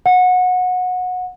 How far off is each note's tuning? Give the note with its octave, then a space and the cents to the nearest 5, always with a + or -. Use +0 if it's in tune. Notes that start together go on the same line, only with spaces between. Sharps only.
F#5 -20